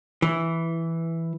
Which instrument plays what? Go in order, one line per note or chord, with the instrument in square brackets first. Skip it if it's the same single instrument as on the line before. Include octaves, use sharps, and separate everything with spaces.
[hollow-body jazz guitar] E3